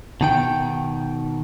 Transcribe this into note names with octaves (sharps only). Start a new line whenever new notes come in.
B2 D#3 G5